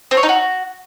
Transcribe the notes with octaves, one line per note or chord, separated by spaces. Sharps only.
C4
C#5
D#4
F#4